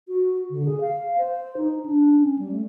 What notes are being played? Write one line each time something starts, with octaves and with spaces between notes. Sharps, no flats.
F#4
D3
G#4
F5
C5
D#4
D4
C#4
G3
A3